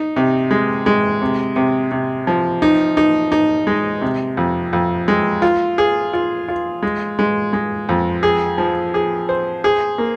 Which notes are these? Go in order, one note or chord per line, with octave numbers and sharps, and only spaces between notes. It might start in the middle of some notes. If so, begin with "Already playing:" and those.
Already playing: D#4
C3
G#3
G#3
C3
C3
C3
F3
D#4
D#4
D#4
G#3
C3
F2
F2
G#3
F4
G#4
F4
F4
G#3
G#3
G#3
F2
G#4
F3
G#4
C5
G#4
A#3